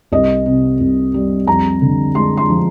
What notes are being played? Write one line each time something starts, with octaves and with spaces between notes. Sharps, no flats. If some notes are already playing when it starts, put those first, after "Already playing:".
C2 D#5
C3
C2
G3
F2 A#5
D3
G#3 C6
C6
F3